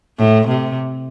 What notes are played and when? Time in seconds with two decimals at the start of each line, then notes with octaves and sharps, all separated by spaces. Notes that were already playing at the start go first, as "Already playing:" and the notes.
0.19 A2
0.48 C3